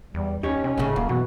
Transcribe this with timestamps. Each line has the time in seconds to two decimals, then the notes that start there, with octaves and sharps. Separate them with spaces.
0.14 E2 G3
0.43 D#2 C#4 D#4 G4 C#5
0.64 C3 C#4
0.78 G#1 A2 C#3
0.96 D1 F#2 A#3
1.09 B2 E3 F#4